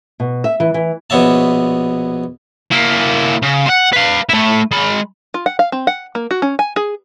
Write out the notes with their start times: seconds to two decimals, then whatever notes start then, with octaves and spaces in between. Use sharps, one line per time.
0.20 B2
0.44 E5
0.60 E3
0.74 E3
1.10 A#1 B2 B3 C#5 E5 A5
2.71 A#3 E4
3.42 C#3
3.66 C5 F#5
3.93 B4 F5
4.29 A3 E4
4.71 G#3 B5
5.34 F4
5.46 F#5
5.59 F5
5.72 C4
5.87 F#5
6.15 A#3
6.31 F#4
6.42 C#4
6.59 G#5
6.76 G#4